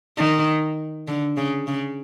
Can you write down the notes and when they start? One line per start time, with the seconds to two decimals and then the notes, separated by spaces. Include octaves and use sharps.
0.18 D#3
1.08 D3
1.37 C#3
1.67 C#3